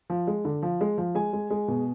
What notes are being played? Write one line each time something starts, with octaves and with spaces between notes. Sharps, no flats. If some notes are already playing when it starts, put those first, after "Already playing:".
F3
G#3
D3
F3
G#3
F3
G#3 G#5
G#3
G#3
B2